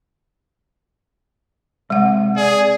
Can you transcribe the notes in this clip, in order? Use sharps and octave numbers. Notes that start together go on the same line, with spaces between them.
C3 G#3 F#5
G#4 D5